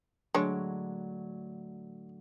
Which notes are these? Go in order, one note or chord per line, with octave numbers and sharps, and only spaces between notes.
A2 D3 F#3 G#3 D4 C#5